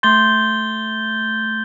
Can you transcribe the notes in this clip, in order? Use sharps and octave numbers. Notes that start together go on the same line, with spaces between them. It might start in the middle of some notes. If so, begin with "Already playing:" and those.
A3 C6 G6 A6 G7